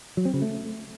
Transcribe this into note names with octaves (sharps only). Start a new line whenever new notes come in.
F#3
C4
C#3
A3